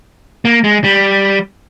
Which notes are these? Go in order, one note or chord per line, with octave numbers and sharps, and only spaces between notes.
A#3
G#3
G3